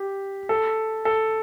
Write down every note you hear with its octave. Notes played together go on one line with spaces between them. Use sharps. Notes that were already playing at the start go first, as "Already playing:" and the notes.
Already playing: G4
A4
A4